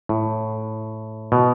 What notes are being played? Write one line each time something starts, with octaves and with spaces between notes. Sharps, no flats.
A2
B2